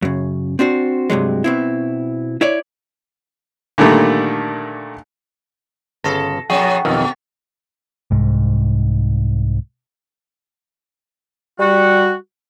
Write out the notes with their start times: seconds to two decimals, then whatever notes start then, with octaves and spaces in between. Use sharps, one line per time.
0.02 F#2 C#3
0.59 C4 D4 F#4 C5
1.10 G2 C3 F#3 G#3
1.44 B2 C4 E4
2.41 E4 C#5 D5
3.78 A#2 D3 D#3 G3 A3 A#3
6.04 G1 C#3 A4 A#6
6.50 F#2 B2 F3 G#4 F#5 G5 C#6
6.85 B1 F2 B2 D#3
8.11 C2 G#2
11.59 G3 F#4